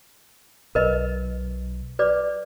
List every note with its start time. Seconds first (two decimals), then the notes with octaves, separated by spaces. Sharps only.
0.75 B1 A#4 B4 D#5
1.99 B4 D5 D6